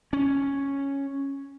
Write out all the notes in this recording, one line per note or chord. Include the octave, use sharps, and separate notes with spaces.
C#4